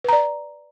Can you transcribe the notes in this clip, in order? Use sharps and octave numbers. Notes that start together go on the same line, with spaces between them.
B4 D5 A#5